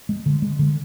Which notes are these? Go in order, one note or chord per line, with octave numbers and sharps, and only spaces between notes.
G#3
D3
G#3
D3